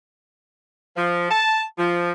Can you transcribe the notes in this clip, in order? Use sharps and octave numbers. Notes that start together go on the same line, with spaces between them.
F3
A5
F3